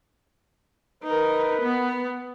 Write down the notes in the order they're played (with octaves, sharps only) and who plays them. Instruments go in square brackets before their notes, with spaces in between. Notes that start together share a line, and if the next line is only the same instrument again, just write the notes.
[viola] D#4 A#4 [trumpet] B4
[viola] B3